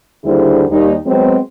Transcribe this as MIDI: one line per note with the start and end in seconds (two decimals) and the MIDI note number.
0.24 0.64 39
0.24 0.64 50
0.24 0.64 55
0.24 0.64 64
0.24 0.64 68
0.24 0.64 72
0.70 0.95 39
0.70 0.95 55
0.70 0.95 63
1.07 1.37 54
1.07 1.37 56
1.07 1.37 59
1.07 1.37 60